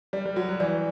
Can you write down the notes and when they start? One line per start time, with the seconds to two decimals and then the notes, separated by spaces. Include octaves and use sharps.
0.13 G3 D5
0.25 G3
0.36 F#3 F#4
0.49 F#3
0.60 E3 D5